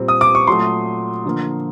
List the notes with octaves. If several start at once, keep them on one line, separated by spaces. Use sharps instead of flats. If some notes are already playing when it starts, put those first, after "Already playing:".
Already playing: A#2 G3 C4
D#6
D6
C#6
A#2 F#3 A3 C6
D3 F3 A#3